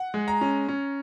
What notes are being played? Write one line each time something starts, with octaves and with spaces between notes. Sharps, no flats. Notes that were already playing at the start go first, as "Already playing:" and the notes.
Already playing: F#5
G#3
A#5
C#4
C#4